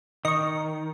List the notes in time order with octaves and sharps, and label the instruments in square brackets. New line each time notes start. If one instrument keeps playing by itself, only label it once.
[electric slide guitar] D#3 [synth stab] D#5 C#6